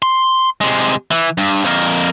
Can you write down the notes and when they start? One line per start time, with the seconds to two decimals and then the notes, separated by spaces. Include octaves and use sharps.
0.02 C6
0.61 C3 G#3
1.11 E3
1.38 G2
1.64 F2 A#4